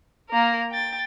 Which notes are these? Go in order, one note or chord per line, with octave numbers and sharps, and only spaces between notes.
A#3 A#4
G5 A6